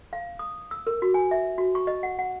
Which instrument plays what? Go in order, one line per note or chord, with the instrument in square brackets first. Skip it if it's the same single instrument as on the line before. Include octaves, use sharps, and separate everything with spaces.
[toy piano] F5
D#6
E6
A#4
F#4
G#5
E5
F#4
C#6
D#5
F#5
F#5